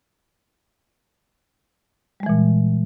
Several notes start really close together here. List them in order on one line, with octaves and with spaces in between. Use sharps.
G3 G#3 E3 A#2